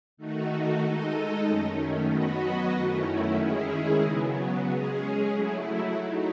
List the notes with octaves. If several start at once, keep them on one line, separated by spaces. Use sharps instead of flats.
D#3 A3 D#4 F#4
G#3 D#4 A4 D#5
F#2 D#3 A3 C#4
F#3 B3 F#4 B4 D#5
F#2 D#3 A3 C#4 E4
D#3 G#3 C#4 E4 G#4
C#3 F#3 B3
G#3 C#4 G#4
F#3 A3 E4
F#3 A3 D#4